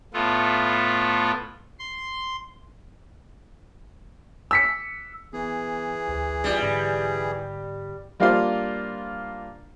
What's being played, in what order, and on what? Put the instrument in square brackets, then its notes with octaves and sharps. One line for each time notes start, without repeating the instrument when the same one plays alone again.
[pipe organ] A2 A3 B3 F4
C6
[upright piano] E6 B6 C#7
[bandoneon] E3 G#4 [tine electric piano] B3
[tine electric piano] A1 D2
[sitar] G3 [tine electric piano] C4 D4 F4
[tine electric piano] G#2 D3 A#6
[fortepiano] G3 A#3 D4 F4 C5 F5